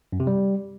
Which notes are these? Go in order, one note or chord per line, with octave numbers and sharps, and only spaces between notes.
F#2
C3
G3